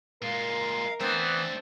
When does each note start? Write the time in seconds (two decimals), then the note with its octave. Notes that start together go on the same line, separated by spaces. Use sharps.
0.22 A#2 G#3 A#4 F5
1.00 E3 A3 B3 C4 D4